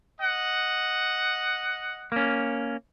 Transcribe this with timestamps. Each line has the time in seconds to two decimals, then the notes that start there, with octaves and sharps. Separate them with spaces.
0.21 D#5 F#5
2.12 A#3 C#4